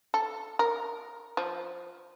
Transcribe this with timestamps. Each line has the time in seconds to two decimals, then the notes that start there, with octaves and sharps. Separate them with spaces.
0.14 A4
0.59 A#4
1.37 F3